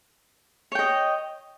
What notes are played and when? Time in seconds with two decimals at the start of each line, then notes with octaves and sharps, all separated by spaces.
0.72 C#5
0.75 G5
0.79 D#5